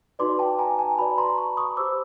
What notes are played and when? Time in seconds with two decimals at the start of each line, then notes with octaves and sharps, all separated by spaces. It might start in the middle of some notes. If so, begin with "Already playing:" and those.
0.19 D#4 F#4 B4 D5 C6 D6
0.39 G5 A5
0.59 G#5 A#5
0.79 G#5 A#5
0.98 F#4 B4 D5 A5 B5
1.18 A#5 C6
1.38 B5 C#6
1.57 C#6 D#6
1.77 G4 C5 D6 E6